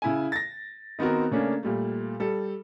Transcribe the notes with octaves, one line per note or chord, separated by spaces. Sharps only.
C#3 E4 G#5
A6 A#6
D#3 B3 C4 F#4 A#4
C#3 A3 A#3 C#4 D4
A#2 G3 A3
G3 A4